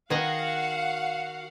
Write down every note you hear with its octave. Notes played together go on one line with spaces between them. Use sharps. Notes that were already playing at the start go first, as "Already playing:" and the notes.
D#3 F#4 G#4 B4 D#5 F5 F#5